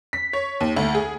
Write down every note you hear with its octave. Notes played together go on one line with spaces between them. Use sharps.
B6
C#5
D#2
D2
G#4